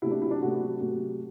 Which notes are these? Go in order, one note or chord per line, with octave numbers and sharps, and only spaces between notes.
C3 F#3 A3 E4
D4
E4
D4
C3 F#3 A3 F#4
C3 F#3 A3